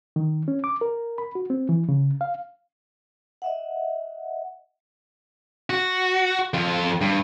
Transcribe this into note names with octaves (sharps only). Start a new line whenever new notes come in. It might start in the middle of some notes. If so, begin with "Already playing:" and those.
D#3
C#4
D6
A#4
B5
F#4
C4
E3
C#3
F5
D#5 E5 F#5
F#4
F2 F4
G2